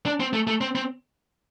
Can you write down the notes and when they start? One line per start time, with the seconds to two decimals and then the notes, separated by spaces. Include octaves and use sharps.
0.06 D4
0.20 C4
0.33 A3
0.47 A3
0.61 C4
0.75 C4